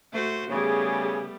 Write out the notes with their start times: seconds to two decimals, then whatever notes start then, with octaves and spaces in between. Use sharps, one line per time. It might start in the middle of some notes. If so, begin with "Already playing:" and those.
0.12 A3 F#4 C5
0.50 C#3 G3 A3 B3 G#4